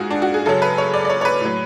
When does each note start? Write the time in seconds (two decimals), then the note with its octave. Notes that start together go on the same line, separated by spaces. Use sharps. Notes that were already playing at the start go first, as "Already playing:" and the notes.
Already playing: G#2 F4 F#4 G#4
0.11 D4
0.22 F#4
0.34 G#4
0.46 F#2 C#3 F#3 A4
0.62 B4
0.78 C#5
0.94 D5
1.05 D5
1.09 C#5
1.21 C#5
1.25 B4
1.40 A2 F#3